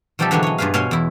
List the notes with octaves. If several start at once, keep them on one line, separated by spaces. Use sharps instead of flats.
B2 F3 G3 D#4 G4 A4
D3 E3 F#3 G#3 D4 C#5
C#5 D#5
G2 F4 G#4 B4 F5
B2 C#5 F5 G#5 C6
E2 E4